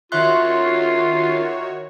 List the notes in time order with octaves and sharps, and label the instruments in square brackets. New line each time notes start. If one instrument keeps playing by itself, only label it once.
[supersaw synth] D#3 F#4 C#5 [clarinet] F4 [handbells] E5 C6 F#6